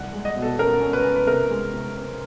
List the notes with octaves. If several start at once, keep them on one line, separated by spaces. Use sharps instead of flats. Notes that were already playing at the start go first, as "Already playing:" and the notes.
Already playing: C2 F#5
G#3
D#5
B2
A4
C#4 A#4
C#4
B4
C#4
B4
C3 A#4
G#3
C3
C4